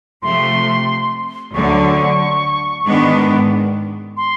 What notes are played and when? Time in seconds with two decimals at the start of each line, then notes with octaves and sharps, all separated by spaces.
0.22 C3 F3 A3 C6
1.54 D2 D3 F#3 C#6
2.85 G#2 D#3 G#3 B3 D4
4.17 C6